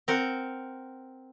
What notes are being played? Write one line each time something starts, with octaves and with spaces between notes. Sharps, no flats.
C4 A#4 F#5